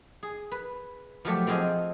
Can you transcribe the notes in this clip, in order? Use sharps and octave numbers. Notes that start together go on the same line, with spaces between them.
G#4
B4
F3 F#3 A3 G4
F3 C4 F4 G#4 C5 D#5